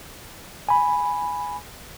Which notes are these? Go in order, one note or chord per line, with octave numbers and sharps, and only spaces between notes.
G#5 B5